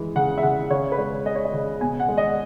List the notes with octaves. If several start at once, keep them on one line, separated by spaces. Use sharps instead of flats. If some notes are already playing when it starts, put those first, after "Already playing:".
Already playing: E3 G#3
C#3 F#5
E5
C#3 F#5
C#3 C#5
B4
G#3 C#5
G#3 D#5
C#5
D#5
C#3
B2 G#5
F#5
G#3
D#5